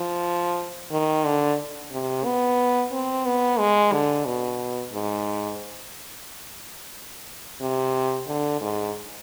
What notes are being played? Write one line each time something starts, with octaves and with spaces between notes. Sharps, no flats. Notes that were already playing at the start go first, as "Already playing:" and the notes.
Already playing: F3
D#3
D3
C3
B3
C4
B3
G#3
D3
B2
G#2
C3
D3
G#2